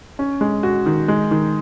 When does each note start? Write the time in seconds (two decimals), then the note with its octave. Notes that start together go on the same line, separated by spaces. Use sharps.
0.19 C#4
0.41 G#3
0.63 F#4
0.86 D#3
1.08 G#3
1.31 D#3